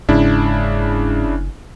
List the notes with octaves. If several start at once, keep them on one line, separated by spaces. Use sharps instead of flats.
F#1 G#2 C#3 D4 E4